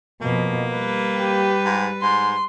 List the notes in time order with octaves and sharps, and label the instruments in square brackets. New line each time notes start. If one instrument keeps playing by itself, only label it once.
[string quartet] F2 B2 [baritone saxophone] A#3
[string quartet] G3 B4
[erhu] G4
[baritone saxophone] G#2
[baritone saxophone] G#2 [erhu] C6